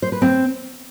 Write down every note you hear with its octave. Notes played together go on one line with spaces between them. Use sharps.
C5
B4
C4